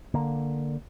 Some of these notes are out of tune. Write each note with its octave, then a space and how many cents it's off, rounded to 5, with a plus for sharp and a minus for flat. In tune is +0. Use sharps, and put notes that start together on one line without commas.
D3 +5 A#3 +0